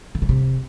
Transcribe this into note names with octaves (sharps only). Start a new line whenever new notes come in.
D3
C#3
C3